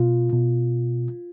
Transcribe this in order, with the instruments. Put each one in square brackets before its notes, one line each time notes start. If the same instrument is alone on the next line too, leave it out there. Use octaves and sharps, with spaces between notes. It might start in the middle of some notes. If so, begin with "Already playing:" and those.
Already playing: [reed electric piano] B2 F4
B2